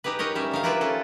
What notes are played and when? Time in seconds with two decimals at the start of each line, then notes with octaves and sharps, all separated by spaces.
0.04 D#4 G4 G#4 B4
0.19 D#4 A#4 C#5 D#5
0.35 G3 C#4 E5
0.51 D3 D#4 F5
0.63 E4 F4 A#4 B4 D5 E5
0.81 C#4 A4